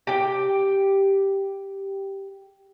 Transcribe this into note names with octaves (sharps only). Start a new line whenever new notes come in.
G4 G5